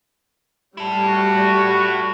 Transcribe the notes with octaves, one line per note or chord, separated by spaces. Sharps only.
G3 E4 A4
F#4